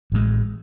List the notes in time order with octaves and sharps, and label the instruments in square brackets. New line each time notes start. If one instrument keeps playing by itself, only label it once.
[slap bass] A1 A2 G#3